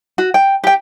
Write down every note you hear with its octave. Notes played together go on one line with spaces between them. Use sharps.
F#4
G5
G4 G5